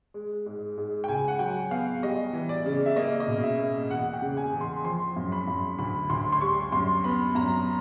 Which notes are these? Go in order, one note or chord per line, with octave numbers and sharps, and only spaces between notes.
G#3
G#2
G#2
G5
C#2 G#5
F#5
F#3 G5
B3 F5
G3 D#5
E3
D5
C#3
E5
A#3 D#5
D#5
B2
E5
A#3
E2 F#5
F#5
G5
C#3
G#5
E2
C6
F3 C6
F#2
B5
F#2
D2 B5
D2 C6
C6
G3 C#6
F#2 C6
B3 B5
F#2 A#5